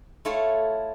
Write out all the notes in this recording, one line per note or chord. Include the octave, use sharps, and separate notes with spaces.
A3 E4 F4 A4 C#5 F5